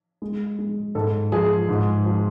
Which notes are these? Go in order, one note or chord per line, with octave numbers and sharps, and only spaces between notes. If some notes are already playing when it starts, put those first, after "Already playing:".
G#3
G#3
G#2 A4
F3 G#4
G#2
F3